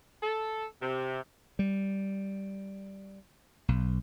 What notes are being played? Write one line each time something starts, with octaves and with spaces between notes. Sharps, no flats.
A4
C3
G3
B1